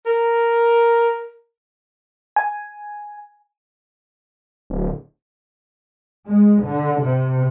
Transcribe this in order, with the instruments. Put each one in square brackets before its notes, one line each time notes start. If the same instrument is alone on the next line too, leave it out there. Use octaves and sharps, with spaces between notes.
[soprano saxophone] A#4
[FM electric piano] G#5
[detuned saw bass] D1
[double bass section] G#3
D3
C3